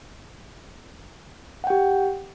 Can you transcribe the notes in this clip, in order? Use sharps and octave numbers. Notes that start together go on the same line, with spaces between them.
G4 F#5 G5